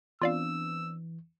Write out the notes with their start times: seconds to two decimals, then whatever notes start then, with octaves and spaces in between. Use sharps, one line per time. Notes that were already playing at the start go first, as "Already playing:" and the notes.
0.22 E3 B3 C4 D4 F4 D5 F5 E6